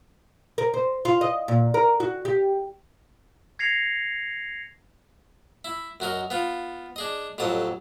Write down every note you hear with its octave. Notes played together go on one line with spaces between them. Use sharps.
A#4
C5
F4
D#5
A#2
A#4
F#4
G4
G#6 A#6 C7 C#7 F7
E4
F#2 F#4 A#4 D#5
B3 F4
D4 G#4 D#5
A1 F2 F#3 A5 D#6